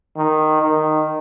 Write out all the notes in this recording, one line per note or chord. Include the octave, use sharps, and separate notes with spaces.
D#3
D#3